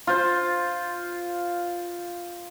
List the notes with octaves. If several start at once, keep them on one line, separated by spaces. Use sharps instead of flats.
F4 C5